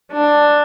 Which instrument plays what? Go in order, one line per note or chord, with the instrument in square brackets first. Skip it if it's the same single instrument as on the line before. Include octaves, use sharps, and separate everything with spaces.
[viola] D4